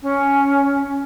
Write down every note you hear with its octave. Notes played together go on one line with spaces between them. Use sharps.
C#4